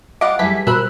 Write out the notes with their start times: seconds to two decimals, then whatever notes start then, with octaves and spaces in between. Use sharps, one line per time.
0.21 G3 F4 D#5 F#5 D6 F6
0.39 E3 F#3 G3 A3 G#4 B4 B6
0.67 B2 A#4 C5 B5 E6 F#6